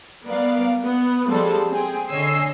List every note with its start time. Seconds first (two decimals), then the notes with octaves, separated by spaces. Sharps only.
0.24 G3 B3 A#4 D5 F5
0.84 B3
1.30 F3 G3 G#3 C4 A4
1.71 C4 G#4 G5
2.09 D3 C#5 D#5 G#5 E6 C7